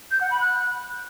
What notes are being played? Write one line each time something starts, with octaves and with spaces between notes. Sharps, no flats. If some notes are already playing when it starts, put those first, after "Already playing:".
G6
F#5
B5
F#6